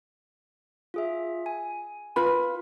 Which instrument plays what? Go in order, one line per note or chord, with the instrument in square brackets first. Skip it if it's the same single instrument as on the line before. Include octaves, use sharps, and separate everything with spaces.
[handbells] F4 G#4 E5
G#5
[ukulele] F4 B4 B5